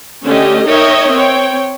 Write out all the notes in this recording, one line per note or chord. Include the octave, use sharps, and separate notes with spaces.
D3 A3 C#4 G4 D#5
D#4 A#4 C#5 D#5 E5 G5
C4 C#5 G5